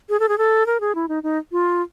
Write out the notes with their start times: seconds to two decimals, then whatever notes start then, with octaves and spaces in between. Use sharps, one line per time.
0.09 G#4
0.20 A4
0.29 G#4
0.38 A4
0.66 A#4
0.80 G#4
0.95 E4
1.08 D#4
1.23 D#4
1.52 F4